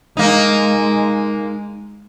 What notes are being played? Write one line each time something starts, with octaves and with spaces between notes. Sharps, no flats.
G#3 A#3 D#4